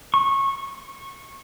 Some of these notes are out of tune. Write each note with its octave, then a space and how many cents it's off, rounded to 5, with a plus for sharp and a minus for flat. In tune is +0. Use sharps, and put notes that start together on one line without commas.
C#6 -20